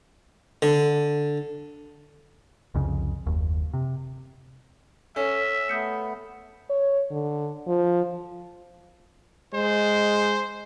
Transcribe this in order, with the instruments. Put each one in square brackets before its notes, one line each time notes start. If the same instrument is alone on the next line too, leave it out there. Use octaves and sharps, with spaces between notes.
[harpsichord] D3
[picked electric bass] C2 F2 C#3
F#1 D#2
C3
[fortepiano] C#4 [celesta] A4 G#5 [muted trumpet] E5
[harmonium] A3 B3 [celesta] D#6 G6 C#7
[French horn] C#5
D3
F3
[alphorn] G#3 [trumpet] C5